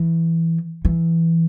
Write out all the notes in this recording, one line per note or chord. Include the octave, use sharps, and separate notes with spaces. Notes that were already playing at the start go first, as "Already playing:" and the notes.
Already playing: E3
E3